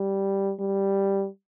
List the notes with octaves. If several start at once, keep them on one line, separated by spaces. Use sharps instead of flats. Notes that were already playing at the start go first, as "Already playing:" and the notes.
Already playing: G3
G3